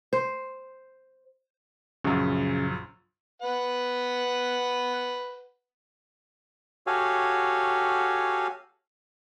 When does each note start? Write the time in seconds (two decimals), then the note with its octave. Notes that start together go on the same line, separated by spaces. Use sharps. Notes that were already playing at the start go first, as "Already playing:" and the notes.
0.13 C5
2.04 A#1 F#2 C#3
3.42 B4 F#5
6.87 F#4 G4 A4 C#5 F5 G#5